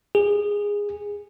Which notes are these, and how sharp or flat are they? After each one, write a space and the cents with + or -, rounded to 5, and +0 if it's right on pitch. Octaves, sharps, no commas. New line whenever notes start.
G#4 -15